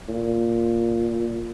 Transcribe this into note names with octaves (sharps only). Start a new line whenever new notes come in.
A#2